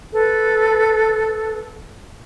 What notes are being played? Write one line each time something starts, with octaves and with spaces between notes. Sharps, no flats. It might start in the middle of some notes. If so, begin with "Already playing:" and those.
A4 B4